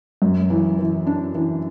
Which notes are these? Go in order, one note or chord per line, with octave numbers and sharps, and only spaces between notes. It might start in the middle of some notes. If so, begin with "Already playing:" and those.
F#2
E3
E3
D4
E3